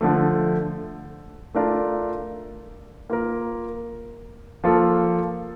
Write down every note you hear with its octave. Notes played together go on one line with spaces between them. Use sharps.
D3 F3 A3
A3 D4 F4 A#4
A#3 F4 A#4
F3 A#3 F4 A4